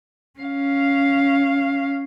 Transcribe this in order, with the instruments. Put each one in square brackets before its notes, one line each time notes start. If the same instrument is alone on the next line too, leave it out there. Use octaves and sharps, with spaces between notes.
[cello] C#4 F5